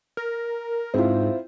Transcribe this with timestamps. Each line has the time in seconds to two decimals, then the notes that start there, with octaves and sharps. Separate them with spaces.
0.17 A#4
0.94 G#2 C4 E4 F4